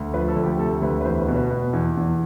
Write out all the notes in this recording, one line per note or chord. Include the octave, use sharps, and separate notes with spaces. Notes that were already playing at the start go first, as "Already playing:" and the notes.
Already playing: D2
F3 B4
A4
D2
G4
C3 A4
D2 B4
B4
E2 C5
B4
B2
B4
B2
E2
E2